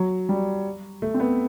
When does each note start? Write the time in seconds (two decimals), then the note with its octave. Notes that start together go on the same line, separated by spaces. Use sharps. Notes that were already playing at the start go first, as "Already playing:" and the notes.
Already playing: F#3
0.29 G3
1.02 A3
1.14 C4
1.20 B3